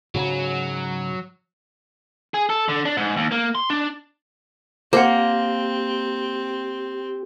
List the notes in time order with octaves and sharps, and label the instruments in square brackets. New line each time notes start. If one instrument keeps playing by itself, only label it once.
[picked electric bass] G#2 C#3 [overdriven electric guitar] F#3
[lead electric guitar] G#4
A4
D3
D4
G#2
D#2
A#3
C6
D4
[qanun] A#3 [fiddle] C4 [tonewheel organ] G4 [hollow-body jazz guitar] C5 F#5